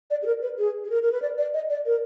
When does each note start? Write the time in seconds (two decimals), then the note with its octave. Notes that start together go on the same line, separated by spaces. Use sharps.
0.10 D5
0.23 G#4
0.26 A#4
0.42 B4
0.58 G#4
0.84 G#4
0.90 A#4
1.03 A#4
1.12 B4
1.22 D5
1.38 D5
1.54 D#5
1.70 D5
1.86 A#4